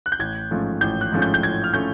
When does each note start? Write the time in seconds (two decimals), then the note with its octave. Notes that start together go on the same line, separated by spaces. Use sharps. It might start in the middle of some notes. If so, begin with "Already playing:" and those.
0.06 F#6
0.12 G6
0.19 A1 G#6
0.51 G#2 F3 A3 C#4
0.81 A1 G6
1.01 F#6
1.12 G#2 F3 A3 C#4
1.22 G6
1.34 G6
1.43 A1 G#6
1.64 F6
1.73 F3 A3 C#4 G6